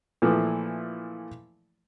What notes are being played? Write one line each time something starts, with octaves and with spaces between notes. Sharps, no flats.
A#2 E3 F3 A3